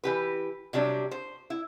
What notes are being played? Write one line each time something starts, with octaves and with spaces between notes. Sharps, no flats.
E3 G4 B4
C3 F#3 G3 D4
C5
E4